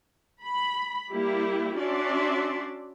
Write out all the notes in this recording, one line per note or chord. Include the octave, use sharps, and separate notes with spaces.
B5
G3 A#3 E4 G4
C#4 D4 F#4 D5 E5 C6